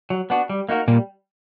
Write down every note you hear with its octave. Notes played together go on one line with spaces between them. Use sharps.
F#3
B3 D4 F#4
G3
A#3 D#4 F#4 A#4
A#2 G3 A#3